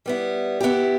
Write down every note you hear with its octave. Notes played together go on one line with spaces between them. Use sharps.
G3 B3 E4
B3 E4 G4